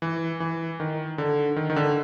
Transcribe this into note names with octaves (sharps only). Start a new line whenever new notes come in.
E3
E3
D#3
D3
D#3
D#3
D3